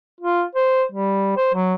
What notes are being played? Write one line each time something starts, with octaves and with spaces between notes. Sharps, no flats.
F4
C5
G3
C5
F#3